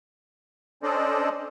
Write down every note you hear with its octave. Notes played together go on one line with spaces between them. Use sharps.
C#4 D4 A4 C5 D5 D#5